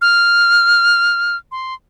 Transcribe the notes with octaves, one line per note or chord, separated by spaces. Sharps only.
F6
C6